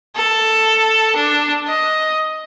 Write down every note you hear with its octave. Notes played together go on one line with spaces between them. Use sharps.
A4
D4
D#5